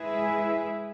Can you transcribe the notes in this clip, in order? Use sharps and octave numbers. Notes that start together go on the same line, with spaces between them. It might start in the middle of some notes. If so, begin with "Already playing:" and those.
Already playing: G#3 E4 G#4 B4 E5